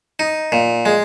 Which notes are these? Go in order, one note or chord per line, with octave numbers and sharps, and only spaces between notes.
D#4
A#2
G#3